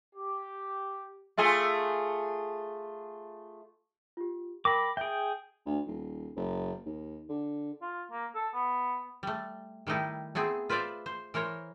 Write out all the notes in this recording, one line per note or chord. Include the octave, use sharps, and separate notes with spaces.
G4
A3 F4 G#4
F4 G4
A#4 G5 B5 D6 A#6
G#4 E5 G5 G6 D7
D2
D#1
F#1
D#2
D3
F4
A#3
A4
B3
G3 A3
D#3 G3 A3 D#4 E4
A3 B3 C4 G#4
F4 B4 C5 D5 E5 F5
C5
E3 A#4 C5 C#5